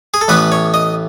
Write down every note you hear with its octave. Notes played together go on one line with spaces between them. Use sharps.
G#4
A4
A1 A2 E3 B3 B4
C#5
D#5